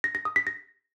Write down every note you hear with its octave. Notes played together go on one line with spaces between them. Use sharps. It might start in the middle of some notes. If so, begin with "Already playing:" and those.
A#6
A#6
D#6
B6
A#6